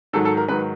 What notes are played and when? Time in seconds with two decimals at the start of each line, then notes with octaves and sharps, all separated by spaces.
0.13 G#2 D#3 F#3 A4
0.25 A4
0.37 A#4
0.48 G#2 D#3 F#3 B4